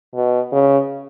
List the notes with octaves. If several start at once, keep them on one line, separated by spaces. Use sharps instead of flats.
B2
C#3